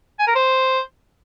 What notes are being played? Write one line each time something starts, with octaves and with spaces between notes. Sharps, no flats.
G#5
A#4
C5